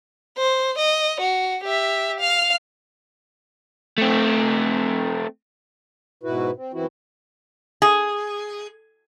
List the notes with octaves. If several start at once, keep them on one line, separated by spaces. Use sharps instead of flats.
C5
D#5
F#4
G4 E5
F5 F6
A3 C4
G#2 B2 E4 F#4 B4
C4
F#2 E3 C4 E4 F#4
G#4